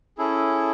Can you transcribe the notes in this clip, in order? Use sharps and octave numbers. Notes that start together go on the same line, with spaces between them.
C#4 E4 G#4 A4